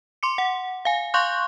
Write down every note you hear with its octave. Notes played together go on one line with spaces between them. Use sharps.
C6 D6 C#7
F#5
F5 G#5
F5 C6 C#6 F#6 G6